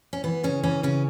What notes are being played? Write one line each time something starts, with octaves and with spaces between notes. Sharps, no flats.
C#4
E3 B3
C#3 C#4
E3 C#4
C#3 C#4